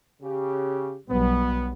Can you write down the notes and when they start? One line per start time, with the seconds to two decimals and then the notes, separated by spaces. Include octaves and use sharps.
0.22 C#3 G4
1.09 B1 F#3 G3 B3